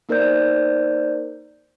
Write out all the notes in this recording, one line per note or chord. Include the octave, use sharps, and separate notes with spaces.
A#3 D#4 A#4 C5 D5 G6